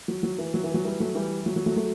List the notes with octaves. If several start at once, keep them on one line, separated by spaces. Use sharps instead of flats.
F#3
F#3
E3
F#3
E3
F#3
E3 G3
F#3 A3
E3 G3
F#3
F#3
F#3 A3
F#3 A3